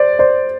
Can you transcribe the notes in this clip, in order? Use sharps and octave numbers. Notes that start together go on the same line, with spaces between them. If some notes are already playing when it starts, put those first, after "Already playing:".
Already playing: C5 D5
C5 D5